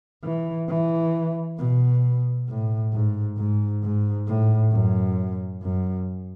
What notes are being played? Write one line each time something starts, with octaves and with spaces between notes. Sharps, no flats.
E3
E3
B2
A2
G#2
G#2
G#2
A2
F#2
F#2